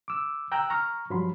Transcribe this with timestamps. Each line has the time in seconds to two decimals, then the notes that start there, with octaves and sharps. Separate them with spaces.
0.08 D6 E6
0.52 G5 A#5 E6 F#6 G6
0.70 A#5 C#6 F6
1.10 G2 F3 F#3 B5 C6